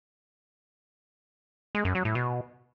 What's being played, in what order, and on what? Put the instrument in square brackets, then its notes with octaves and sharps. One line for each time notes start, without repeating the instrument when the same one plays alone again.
[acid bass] G#3
F#2
F#3
A2
B2